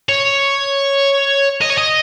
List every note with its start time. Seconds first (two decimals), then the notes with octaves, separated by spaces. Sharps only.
0.09 C#5
1.61 D#5
1.70 C#5
1.78 D#5